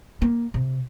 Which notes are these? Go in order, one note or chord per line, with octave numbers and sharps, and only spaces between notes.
A#3
C3